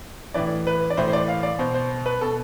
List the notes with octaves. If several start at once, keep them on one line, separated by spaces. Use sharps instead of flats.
A2 E3 D5
B4
D5
A2 E3 C5
C5
D5
F5
D5
B2 C5
C5
B4
B2 A4